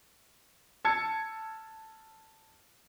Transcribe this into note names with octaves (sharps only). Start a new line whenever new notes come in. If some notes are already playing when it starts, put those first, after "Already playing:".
A5 E6 G#6 C#7